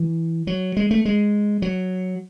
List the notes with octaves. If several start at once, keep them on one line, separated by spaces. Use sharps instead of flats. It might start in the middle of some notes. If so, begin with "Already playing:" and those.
Already playing: E3
F#3
G#3
A3
G#3
F#3